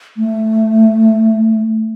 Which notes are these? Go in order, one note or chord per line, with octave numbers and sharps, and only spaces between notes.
A3